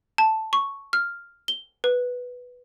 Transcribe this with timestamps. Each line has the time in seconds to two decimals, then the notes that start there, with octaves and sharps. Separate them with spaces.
0.18 A5
0.53 C#6
0.93 F6
1.48 G7
1.84 B4